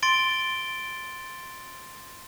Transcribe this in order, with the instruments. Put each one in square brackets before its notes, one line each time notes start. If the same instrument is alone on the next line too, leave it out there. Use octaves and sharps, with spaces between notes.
[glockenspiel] C6 A6 D7 G7